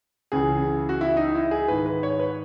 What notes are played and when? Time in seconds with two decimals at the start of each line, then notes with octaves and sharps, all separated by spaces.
0.32 C#2 C#3 E3 G#4
0.89 F#4
1.01 E4
1.17 D#4
1.35 E4
1.51 G#4
1.68 G#2 D#3 B4
1.86 B4
2.03 C#5
2.20 B4